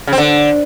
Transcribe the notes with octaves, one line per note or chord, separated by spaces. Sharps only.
C#3
C4
D3